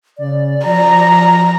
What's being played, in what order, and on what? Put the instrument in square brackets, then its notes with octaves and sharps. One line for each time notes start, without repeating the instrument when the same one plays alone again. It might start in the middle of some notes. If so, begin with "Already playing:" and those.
[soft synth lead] C#3 [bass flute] D5
[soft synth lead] F3 [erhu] A#5